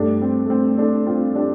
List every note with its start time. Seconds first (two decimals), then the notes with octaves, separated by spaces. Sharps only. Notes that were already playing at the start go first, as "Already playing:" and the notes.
Already playing: G2 G3 A3 D4
0.21 C4
0.45 A3
0.50 C4
0.78 A3 D4
1.07 C4 F4
1.35 D4 G4